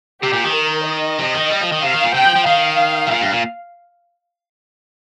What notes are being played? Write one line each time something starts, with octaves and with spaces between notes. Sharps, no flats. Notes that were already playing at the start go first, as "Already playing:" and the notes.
C3 G4
A#2
D#3
A#4
D#5
C3
D#3
G3
F3
D#3
C3 F5
D#3
A#2
C3 G5
F3
F3
D#3 F5
C3
A#2
G2
A#2